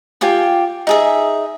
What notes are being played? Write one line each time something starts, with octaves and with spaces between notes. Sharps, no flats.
F4 G4 G5 G#5
D#4 G#4 E5